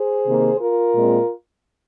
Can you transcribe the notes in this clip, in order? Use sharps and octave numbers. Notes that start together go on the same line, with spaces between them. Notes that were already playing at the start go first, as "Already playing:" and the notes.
Already playing: G#4 C5
C3 D#3 A#3
F4 A#4
A#2 G#3 C4